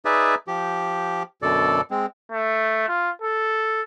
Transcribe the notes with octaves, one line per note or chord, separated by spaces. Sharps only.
D#4 G#4 B4 D5 E5
F3 G4
F#2 B2 D3 A4 D5
G#3 C4
A3
F4
A4